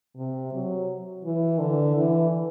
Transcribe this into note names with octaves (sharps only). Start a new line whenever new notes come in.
C3
F#3
E3
D3
E3